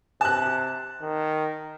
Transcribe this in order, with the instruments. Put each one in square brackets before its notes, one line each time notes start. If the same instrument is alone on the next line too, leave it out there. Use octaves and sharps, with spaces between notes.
[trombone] C3 [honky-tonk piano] A5 F#6
[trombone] D#3